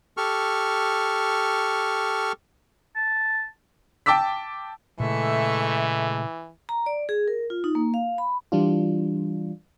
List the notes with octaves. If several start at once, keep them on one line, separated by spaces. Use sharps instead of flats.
G4 A4 C#6 F6
A5
G5 A5 D6 E6 B6
A#2 C#3 E3 G#3 A3 E5 C#6
A#5
D5
G#4
A#4
F4
D#4
A#3
F5
B5
E3 G3 D4 F4